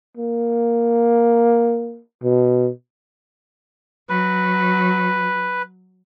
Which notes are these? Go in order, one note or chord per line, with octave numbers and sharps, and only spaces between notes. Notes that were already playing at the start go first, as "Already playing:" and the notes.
A#3
B2
F#3 B4